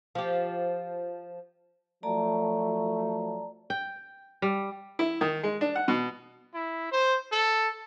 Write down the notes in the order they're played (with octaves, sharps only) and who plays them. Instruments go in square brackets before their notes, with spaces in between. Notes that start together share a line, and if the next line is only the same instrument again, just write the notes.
[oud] F3 G4
[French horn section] F3 F#3 A3 [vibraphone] D5 A5 A#5
[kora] G5
G3
[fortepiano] E4
D#3
G#3
D4
F#5
B2
[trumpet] E4
C5
A4